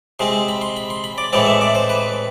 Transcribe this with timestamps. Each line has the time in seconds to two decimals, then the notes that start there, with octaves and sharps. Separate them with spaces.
0.19 C3 G#3 C4 C6
0.48 B5
0.61 C6
0.77 B5
0.90 C6
1.04 B5
1.18 D5
1.33 A2 E3 G#3 C4 D5
1.47 E5
1.61 D5
1.75 C5
1.89 B4